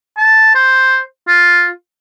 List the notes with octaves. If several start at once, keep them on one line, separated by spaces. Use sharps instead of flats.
A5
C5
F4